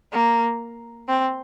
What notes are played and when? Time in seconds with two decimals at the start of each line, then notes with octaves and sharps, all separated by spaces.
0.13 A#3
1.09 C4